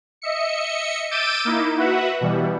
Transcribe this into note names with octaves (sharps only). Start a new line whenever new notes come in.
D#5 E5 C#7
D6 E6 G6 A6 D7 D#7
A#3 D#4 E4
F#4 B4 E5 F#5
B2 E3 G3